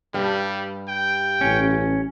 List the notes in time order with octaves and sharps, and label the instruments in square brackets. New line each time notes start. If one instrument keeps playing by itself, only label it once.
[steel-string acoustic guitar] G2 [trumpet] G3
[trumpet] G5
[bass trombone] A1 [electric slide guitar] C#4